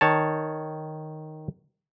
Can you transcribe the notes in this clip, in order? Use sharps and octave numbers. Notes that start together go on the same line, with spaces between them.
D#3 C#5 A5